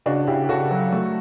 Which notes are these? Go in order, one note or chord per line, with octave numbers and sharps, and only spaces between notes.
C#3 D4 F#4
C#3 E4 G4
G4
C#3 F#4 A4
F#3
A3